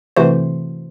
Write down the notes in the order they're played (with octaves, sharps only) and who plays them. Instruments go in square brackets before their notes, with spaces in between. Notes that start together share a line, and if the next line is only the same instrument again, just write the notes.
[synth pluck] C3 E3 A3 F#4 C5